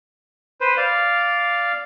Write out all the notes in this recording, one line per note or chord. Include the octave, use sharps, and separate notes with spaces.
B4 C5
D5 F5